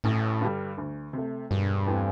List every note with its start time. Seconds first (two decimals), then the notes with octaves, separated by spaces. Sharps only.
0.04 A1 A2
0.41 G2 D3 G3
0.77 D2
1.13 C3 A3
1.51 E1 G2
1.87 E2 E3 A3 C4